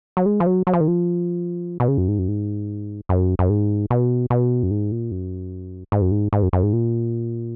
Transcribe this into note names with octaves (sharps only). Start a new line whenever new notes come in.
F#3
G#3
F3
F#3
F#3
F3
D#3
F3
B2
C#3
F#2
G#2
F#2
G#2
F#2
F#2
G#2
B2
B2
F#2
G#2
A#2
F#2
G#2
F#2
G#2
G#2
F#2
F#2
G#2
A#2